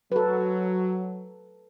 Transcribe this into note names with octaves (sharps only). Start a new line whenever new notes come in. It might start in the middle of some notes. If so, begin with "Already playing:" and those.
F#3 A4 B4